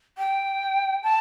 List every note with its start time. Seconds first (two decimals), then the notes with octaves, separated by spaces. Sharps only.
0.18 G5
1.03 A5